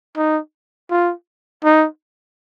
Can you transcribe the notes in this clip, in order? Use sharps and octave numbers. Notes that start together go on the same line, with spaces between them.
D#4
F4
D#4